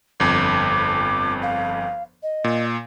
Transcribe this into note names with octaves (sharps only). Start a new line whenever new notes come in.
G1 F2 D6
F5
D#5
A#2